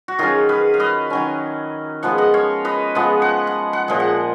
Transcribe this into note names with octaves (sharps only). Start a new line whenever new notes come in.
F#4
D#3 F#3 C#4 F4 G#4
G#4 B4
F5
B4 D#5
D#3 F#3 C#4
F3 G#3 B3 F#5
D#5 F#5
C#5 F5
B4 D#5
F3 G#3 B3 F#5
F#5
F#5
F#5
A#2 F3 G#3
F#5